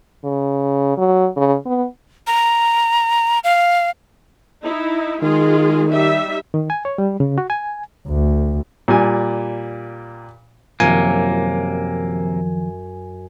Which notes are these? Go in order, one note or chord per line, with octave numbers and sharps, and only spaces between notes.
C#3
F#3
C#3
B3
A#5
F5
D#4 E4
D#3 G#3 F4 G#4
G3 D#4 E5
D#3
G#5
C#5
G3
C#3
F#4
G#5
D2
A#2 G3 G#5
F#2 C3 D#3 F3 A#3 G#5